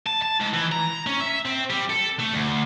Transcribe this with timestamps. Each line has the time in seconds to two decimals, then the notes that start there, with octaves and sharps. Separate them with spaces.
0.06 A5
0.22 A5
0.40 G#2
0.53 E3
0.72 A#5
1.07 C#4
1.20 E5
1.46 C4
1.70 G3
1.90 A4
2.20 A3
2.34 D2